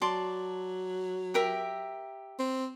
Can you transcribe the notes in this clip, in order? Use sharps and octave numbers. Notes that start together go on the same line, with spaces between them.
F#3 D5 A5 C6
G4 A#4 E5
C4